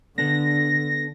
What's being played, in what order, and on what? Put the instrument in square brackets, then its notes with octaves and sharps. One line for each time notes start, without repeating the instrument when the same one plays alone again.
[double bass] D3 [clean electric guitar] B3 D4 A4 [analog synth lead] A#6